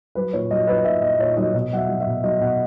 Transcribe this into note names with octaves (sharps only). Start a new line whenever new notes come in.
F#3 B4
A#2 C#5
F#3 D#5
F#3 B4
A#2 E5
A#2 D#5
A#2 C#5
F#3 D#5
B2 D#5
F#3 E5 F#5
F#3
E5
B2
F#3 D#5
B2 F#5